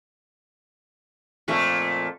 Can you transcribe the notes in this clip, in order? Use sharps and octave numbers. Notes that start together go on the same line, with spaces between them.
F2 A#2 A3